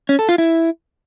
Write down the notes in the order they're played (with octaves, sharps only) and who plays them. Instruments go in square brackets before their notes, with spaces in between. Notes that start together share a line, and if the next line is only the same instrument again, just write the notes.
[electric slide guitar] C#4
A4
F4
E4